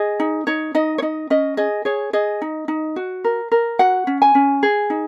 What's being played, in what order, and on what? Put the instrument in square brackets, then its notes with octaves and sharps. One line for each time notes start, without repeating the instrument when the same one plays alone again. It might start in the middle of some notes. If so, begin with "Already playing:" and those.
Already playing: [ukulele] G#4 D#5
D#4
D#4 C#5
D#4 D#5
C#5
D#4 D#5
C#4 D#5
G#4 D#5
G#4 C#5
G#4 D#5
D#4
D#4
F#4
A#4
A#4
F#4 F#5
C#4
G#5
C#4
G#4
D#4